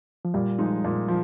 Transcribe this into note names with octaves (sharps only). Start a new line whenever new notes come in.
F3
A#2 G3
F3 G#3 D#4
A#2
F3